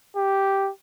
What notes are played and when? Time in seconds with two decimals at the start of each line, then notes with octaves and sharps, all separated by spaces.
0.16 G4